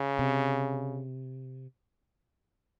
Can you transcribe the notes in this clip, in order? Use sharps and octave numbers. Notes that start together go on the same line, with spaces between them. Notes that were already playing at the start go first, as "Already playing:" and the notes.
Already playing: C#3
C3